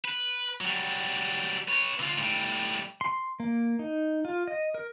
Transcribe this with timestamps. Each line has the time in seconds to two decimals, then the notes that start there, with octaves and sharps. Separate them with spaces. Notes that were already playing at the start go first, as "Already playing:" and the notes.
0.05 B4
0.61 F#3 G3
1.68 B4 C#5
2.00 D3 F4
2.18 A2 G3
3.01 C6
3.40 A#3
3.79 D#4
4.25 F4
4.47 D#5
4.74 A#4